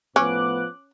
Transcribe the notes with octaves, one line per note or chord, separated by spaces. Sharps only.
A2 F3 B3 C#4 D6 F#6